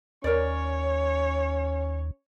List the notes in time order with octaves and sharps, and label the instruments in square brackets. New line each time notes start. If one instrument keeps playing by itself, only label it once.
[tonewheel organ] D#2 [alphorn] C#4 [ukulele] A#4 D5 [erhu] C#5